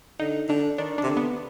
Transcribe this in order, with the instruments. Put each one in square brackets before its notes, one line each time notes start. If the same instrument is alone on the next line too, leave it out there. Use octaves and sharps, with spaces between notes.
[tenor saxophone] D3 [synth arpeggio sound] D#4
[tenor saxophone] D3 [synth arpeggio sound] D4
[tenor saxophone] D#3 [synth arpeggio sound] D4
[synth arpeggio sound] D4
[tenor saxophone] C3
D3
[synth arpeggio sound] B3